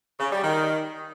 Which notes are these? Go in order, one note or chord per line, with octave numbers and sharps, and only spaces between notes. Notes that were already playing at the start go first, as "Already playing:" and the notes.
C#3
G3
D#3